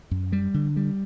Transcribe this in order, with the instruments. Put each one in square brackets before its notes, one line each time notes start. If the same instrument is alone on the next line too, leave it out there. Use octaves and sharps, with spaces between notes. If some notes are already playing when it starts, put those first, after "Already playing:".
[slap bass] F#2
G3
D3
G3